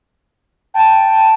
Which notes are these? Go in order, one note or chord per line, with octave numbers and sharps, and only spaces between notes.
G5 A5